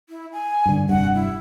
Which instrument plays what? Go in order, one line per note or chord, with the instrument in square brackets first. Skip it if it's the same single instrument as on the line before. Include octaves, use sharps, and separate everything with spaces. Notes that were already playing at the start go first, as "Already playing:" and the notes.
[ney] E4
G#5
[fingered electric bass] G2 D3
[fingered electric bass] F1 G2 [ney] F#5
[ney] E4